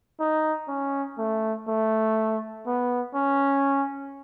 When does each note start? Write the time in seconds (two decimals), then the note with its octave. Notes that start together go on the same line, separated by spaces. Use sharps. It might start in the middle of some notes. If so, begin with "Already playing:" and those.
0.20 D#4
0.68 C#4
1.18 A3
1.68 A3
2.66 B3
3.15 C#4